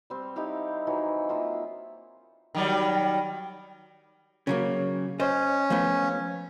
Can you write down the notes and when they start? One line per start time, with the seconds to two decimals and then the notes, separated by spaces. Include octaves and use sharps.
0.10 G3 C4
0.36 D#4 E4 G4 F5
0.87 E3 F#3 D#4 E4
1.29 A#3 F4 E5 F#5
2.55 D#3 F#3 G3
4.47 C#3 F#3 A#3
5.20 C#4 C5 D#5
5.70 F3 A3 B3